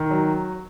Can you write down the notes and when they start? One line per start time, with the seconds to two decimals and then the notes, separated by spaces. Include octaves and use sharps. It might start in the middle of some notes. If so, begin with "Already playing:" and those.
Already playing: D#3
0.11 F#3